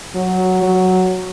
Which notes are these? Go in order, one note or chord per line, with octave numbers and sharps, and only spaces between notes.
F#3
F#3